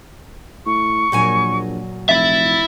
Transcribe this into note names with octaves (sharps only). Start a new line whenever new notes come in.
A2 C#6
A#1 A#2 F#3 G#5
F1 E4 E5 A6